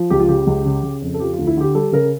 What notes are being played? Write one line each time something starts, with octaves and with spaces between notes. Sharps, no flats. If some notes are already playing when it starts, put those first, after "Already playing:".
Already playing: F3
C#2 G4
F4
C#3 G4
C#2
C#3
C#3
F2
A4
F3 G4
F4
D2
E4
D3 G4
G3 A4
C#3 A#4